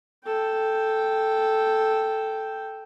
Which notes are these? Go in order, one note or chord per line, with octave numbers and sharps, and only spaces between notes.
A4 G5